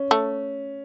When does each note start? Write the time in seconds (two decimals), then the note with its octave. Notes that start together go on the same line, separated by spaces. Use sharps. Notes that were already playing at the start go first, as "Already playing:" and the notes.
Already playing: C#4
0.11 A3